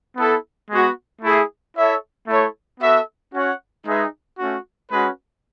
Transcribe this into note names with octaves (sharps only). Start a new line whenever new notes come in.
B3 E4 A4
G#3 B3 F#4
A3 E4 G#4
E4 A4 C#5 E5
A3 E4 A4 C#5
B3 F#4 A4 E5
C#4 F#4 C#5 F#5
G#3 D#4 G#4 B4 E5
A3 C#4 F#4
G#3 C#4 F#4 B4